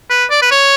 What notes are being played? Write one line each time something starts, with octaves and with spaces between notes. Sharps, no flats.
B4
D5
B4
C#5